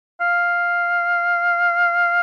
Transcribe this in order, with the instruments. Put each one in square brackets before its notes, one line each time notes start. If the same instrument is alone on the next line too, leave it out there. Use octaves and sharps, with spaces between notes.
[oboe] F5